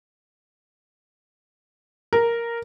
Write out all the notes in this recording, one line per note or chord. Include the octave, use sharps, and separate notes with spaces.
A#4